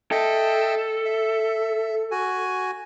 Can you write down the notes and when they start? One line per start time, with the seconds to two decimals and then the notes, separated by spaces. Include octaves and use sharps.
0.11 A4 D#5 E5 G5
1.05 E5
2.11 F#4 G#5